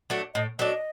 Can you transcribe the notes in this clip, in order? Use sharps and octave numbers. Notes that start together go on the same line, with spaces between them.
F#3 A3 D4
A2 D#5
F#3 A3 D4 D#5